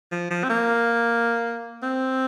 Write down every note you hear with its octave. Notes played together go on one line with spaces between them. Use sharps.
F3
F3
C4
A#3
C4